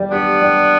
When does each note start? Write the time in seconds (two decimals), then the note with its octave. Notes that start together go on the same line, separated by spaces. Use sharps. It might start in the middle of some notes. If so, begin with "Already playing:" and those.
Already playing: G3
0.11 B3 D4 G4
0.41 G3